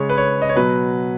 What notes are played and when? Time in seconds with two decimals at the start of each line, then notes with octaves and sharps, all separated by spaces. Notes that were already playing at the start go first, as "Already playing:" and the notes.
Already playing: C#3 G#3 C#5
0.10 B4
0.18 C#5
0.42 D#5
0.49 C#5
0.56 B2 F#3 B4